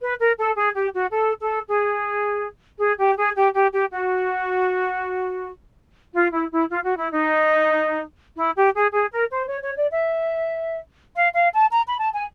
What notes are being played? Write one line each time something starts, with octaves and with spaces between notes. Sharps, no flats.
B4
A#4
A4
G#4
G4
F#4
A4
A4
G#4
G#4
G4
G#4
G4
G4
G4
F#4
F4
E4
E4
F4
F#4
E4
D#4
E4
G4
G#4
G#4
A#4
C5
C#5
C#5
D5
E5
F5
F5
A5
A#5
B5
A5
G#5